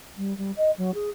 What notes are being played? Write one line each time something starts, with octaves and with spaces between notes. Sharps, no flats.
G3
G3
D#5
F#3
G#4